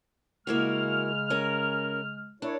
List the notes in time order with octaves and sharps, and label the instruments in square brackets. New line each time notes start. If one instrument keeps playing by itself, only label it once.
[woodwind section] C#3 G#3 F6 [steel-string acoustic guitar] A#3 E4 F#4
[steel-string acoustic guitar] C#4 A#4
[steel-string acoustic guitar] D4 [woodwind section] E4 A#4 C#5